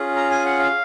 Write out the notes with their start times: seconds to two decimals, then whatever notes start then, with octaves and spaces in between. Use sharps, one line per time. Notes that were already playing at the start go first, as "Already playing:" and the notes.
Already playing: C#4 F4 G#4
0.16 A#5
0.30 G#5
0.45 F#5
0.59 F5